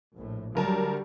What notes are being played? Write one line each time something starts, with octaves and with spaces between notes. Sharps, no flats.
A#1 A2
D2 F#3 G3 A#4 A5